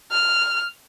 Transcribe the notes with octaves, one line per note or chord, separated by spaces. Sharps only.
F6